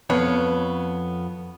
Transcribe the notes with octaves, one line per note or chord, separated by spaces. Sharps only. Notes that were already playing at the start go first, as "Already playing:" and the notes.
F2 B3 C#5